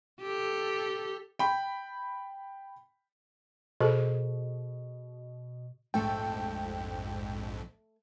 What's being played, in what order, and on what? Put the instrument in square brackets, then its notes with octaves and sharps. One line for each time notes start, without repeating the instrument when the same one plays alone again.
[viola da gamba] G4 A4
[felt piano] G5 B5
[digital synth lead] B2 [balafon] G#4 A4 C5
[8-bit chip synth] A#1 F2 G#2 [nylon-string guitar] A3 A4 [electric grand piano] G5